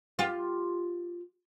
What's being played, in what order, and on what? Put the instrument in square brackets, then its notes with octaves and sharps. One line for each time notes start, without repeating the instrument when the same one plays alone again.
[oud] F4 G4